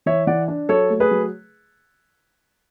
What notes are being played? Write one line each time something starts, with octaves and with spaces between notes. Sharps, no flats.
E3 C#5 E5
E3 D5 F#5
D4
F#3 A4 C#5
A3
G#4 B4
F#3